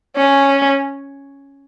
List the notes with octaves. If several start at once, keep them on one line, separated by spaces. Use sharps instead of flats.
C#4